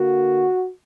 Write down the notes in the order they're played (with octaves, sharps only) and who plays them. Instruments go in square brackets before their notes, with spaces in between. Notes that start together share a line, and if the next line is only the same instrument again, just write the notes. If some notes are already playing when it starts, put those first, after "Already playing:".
Already playing: [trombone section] D3 A#3 F#4